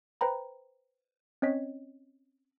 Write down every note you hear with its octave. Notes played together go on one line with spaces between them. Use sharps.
B4 C5 G5 A#5 B5
C4 C#4 C#5 D#5 B6